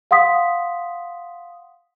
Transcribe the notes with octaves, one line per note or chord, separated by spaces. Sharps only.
F5 F#5 C6 D#6 B6